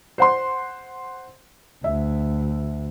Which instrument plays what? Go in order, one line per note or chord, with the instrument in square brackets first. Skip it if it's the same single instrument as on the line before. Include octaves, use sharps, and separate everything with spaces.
[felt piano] C5 F#5 C6
[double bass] D2 [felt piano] E5